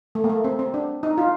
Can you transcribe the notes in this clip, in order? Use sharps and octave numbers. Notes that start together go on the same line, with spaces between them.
A3
A#3
A3
C4
C4
D4
D#4
F4